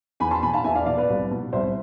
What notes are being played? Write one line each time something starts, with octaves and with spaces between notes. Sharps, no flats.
E2 G#5 B5
A5 C6
B2 G#5 B5
F5 A5
E2 E5 G#5
D5 F5
B2 D5 F5
B4 D5
C2
B2
C2 C5 E5